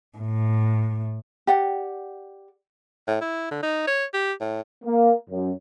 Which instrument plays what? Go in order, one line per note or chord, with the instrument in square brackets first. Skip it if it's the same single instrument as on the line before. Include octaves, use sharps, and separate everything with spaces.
[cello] A2
[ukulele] G4 D5 F#5
[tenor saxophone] A2
E4
D3
D#4
C#5
G4
A2
[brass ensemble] A#3
F#2